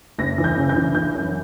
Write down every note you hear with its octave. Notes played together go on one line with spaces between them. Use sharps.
F#1 A#6
E3
G6
C#3
G6
E3
E3 G6
F#2